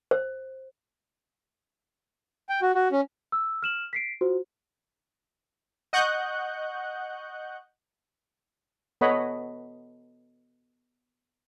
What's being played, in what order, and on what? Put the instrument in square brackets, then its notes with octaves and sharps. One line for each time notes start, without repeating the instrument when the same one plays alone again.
[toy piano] C5
[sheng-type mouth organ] G5
F#4
F#4
C#4
[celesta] E6
F6 E7 F#7
B6 C7 D7
F4 F#4 C5
[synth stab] D#5 F#5 C#6 F#6 G6
[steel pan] B3 A4 C#5 D#5 F#5 B5